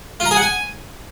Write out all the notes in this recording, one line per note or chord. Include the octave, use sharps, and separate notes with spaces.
F4
A#5
G#4
F#5
G#5